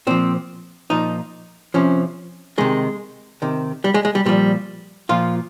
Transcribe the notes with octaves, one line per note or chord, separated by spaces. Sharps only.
A#2 F3 C4
A#2 F3 D#4
C3 F3 C#4
C3 D#3 G#3
C3 D#3
G3
G#3
G#3
G3
A#2 F3 G3
A#2 F3 F4